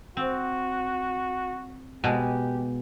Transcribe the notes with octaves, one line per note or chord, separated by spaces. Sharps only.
C4 F#4
B2 G#3 G4